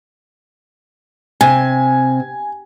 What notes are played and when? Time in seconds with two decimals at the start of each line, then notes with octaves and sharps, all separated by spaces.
1.41 C3 G#5